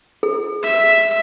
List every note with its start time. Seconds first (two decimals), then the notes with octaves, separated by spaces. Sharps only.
0.23 G#4
0.63 E5